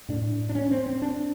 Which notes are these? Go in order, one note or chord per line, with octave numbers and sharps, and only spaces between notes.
A2 D4
D4
C#4
C4
C4
D4